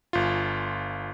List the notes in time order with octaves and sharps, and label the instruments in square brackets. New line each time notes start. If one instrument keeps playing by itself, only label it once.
[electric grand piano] G1 F4